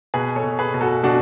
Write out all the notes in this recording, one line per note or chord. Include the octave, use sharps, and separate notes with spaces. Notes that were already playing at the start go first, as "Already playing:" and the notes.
B2 G#4 B4
A4 C#5
B2
G#4 B4
B2
F#4 A4
B2 D4 F#4